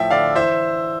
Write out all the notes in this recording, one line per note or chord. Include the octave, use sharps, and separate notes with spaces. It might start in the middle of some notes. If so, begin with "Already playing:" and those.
Already playing: A2 F3 E5 G5
D3 D5 F5
E3 C5 E5